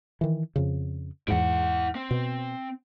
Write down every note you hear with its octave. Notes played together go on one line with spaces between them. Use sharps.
D#3 E3
F2 C#3
E2 G#2 E4 F#5
C4
B2